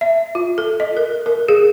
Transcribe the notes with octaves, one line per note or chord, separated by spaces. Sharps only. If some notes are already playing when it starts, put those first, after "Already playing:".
E5
F4
A4
D#5
A#4
A#4
G#4